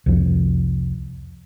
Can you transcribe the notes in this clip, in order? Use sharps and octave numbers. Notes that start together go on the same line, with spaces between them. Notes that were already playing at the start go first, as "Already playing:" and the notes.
C2 F2